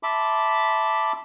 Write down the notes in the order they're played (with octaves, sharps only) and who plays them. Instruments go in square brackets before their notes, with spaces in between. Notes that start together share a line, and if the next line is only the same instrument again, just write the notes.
[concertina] E5 A5 B5 C6 D6